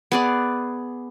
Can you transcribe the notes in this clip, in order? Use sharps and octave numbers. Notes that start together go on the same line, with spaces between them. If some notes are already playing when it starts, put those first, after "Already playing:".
B3 G#4 D5